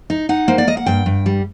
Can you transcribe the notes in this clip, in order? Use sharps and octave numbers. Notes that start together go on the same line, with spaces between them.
D#4
D#4 F#5
A#3 C5
D5
A#3 D#5
F#5
G2 G5
G2
G3